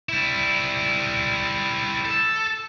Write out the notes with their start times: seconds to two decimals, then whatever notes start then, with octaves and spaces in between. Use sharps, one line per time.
0.09 G3 E4
2.05 A4